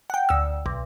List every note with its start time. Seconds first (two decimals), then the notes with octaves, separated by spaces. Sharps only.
0.10 F#5 G5
0.29 D2 E6
0.66 B1